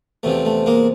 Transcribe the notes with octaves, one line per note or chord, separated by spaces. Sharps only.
E2 C3 F3 A3
A3
G#3 A#3